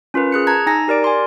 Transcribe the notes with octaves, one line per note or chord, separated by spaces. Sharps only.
C#4 F4 A#4 B4
G#4 F#6 C#7
A5 A#5 G#6
D#4 G#5 A#5 A#6
G4 A#4 D5 D7
G#5 C6